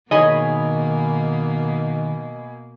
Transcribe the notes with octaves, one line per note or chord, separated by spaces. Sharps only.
B2 D#3 A#3 G#4 C#5 D#5 G#5 B5